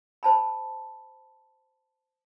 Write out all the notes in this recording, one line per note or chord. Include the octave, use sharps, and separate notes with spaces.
C5 A5 B5